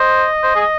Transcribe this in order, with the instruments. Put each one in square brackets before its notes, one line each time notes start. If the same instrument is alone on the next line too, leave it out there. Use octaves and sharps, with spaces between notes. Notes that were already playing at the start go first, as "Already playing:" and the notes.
Already playing: [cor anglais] C5 [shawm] D#5
[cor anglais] C5
G#4